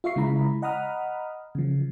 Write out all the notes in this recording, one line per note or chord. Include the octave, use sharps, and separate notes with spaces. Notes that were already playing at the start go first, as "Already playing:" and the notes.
F4 E5 F5 C#6 C7
C#3 G#3 E4 A#5 B5
D#5 F#5 A#5 B5 D#6 F6
C#3 F3